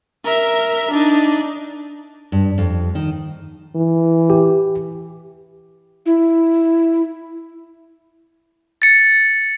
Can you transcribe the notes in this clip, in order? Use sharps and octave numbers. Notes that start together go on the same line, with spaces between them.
A#4 E5
D4 D#4
G2
F2
D#3
E3
G4
E4
A6 C#7